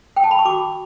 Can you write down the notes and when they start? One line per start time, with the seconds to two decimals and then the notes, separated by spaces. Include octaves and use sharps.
0.16 G5
0.24 A5
0.31 B5
0.39 C#6
0.45 F#4 B5 D6